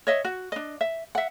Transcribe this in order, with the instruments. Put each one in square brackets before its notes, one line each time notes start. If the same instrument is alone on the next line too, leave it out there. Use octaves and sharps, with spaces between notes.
[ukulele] C#5 D#5 E5
F#4
D4 D#5
E5
E5 F#5